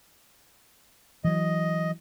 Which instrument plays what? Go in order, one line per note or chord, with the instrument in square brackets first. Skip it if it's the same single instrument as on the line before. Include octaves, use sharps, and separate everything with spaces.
[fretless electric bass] E3 F#3 [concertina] D#5